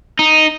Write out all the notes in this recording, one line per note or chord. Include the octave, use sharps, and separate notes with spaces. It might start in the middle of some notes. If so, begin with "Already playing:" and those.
D#4